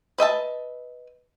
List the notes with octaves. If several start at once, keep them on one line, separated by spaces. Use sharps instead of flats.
B4 D#5 E5 A5